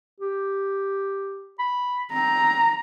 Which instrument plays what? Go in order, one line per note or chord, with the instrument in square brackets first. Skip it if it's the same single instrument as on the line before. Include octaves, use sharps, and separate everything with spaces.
[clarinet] G4
B5
[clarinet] C4 [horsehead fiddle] A#5